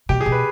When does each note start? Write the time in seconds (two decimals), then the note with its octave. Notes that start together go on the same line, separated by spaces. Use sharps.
0.09 B2 G4
0.21 G#4
0.26 B2
0.32 B4